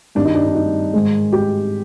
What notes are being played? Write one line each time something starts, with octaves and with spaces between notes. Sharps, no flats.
G2 D#3 G3 D4
D#4
D4
D4
D#4
G#2 D#3 G#3
G4